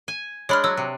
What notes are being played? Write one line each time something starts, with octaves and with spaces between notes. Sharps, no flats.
G#5
G#3 D4 C#5 B5 F6
F#3 C#5 E6
C3